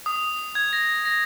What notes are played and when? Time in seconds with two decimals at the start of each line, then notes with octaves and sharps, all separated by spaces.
0.06 D#6
0.55 G#6
0.73 A#6
1.05 A#6